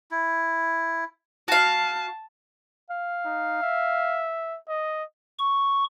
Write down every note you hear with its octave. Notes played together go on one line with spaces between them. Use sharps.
E4
F#4 F5 A5
F5
D#4
E5
D#5
C#6